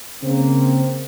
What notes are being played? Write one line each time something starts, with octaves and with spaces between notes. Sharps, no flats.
C#3 A#3 C4